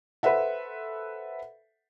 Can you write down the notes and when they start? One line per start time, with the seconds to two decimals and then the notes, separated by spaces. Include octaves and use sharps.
0.23 A4 B4 C5 E5 F#5